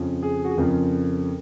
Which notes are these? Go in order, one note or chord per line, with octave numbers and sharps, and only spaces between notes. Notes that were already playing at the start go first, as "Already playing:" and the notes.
Already playing: F2 C#3 F3
G#4
F#4
G#4
F2 C#3 F3 A#4